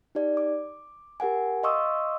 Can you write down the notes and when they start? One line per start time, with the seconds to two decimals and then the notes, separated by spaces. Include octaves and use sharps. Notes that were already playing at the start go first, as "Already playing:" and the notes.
0.15 D#4 G4 D5
0.37 D6
1.20 G4 A#4 F#5 G#5
1.63 D#5 F5 C6 C#6 D#6 E6